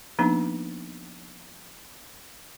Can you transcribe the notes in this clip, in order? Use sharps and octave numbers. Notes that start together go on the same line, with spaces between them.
F3 A#3 B3 D4 D#4